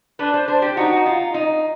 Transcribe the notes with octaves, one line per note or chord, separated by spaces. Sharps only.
D4 B4
C5
D4 C5
G4
D#4 F#4
F4
D#4